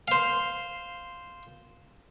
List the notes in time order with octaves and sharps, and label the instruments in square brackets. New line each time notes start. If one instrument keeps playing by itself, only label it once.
[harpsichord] C5 F5